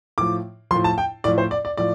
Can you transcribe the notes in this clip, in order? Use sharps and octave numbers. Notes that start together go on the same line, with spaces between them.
A2 F3 D6
A2 F3 C6
A5
G5
A2 F3 D5
C5
D5
D5
A2 F3 D5